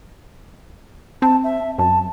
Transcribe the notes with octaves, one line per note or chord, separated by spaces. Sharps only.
C4 A5
E5
F#2 A5